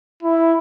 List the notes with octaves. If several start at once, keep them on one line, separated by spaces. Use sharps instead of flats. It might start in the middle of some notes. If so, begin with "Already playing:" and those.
E4